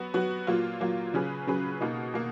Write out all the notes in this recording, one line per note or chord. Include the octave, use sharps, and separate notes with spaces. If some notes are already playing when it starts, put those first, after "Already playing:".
Already playing: F#3 B3 F#4
F#3 B3 F#4
A#2 F#3 A#3 F4
A#2 F#3 A#3 F4
C#3 F#3 C#4 G#4 B4
C#3 F#3 C#4 G#4 B4
B2 A#3 D#4
B2 A#3